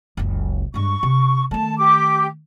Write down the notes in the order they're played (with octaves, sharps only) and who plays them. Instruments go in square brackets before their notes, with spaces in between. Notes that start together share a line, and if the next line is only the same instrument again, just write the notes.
[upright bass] F#1 C#2
[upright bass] G2 G#3 [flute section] C#6
[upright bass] C3
[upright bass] D#3 A3 [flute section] A5
[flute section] G4 D6